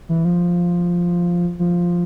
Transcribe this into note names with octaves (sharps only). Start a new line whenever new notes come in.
E3
F3
F3